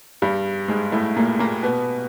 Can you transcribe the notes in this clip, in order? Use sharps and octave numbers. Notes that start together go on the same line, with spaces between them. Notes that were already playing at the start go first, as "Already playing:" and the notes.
G2 G3
G#2 G#3
A2 A3
A#2 A#3
A#2 A#3
B2 B3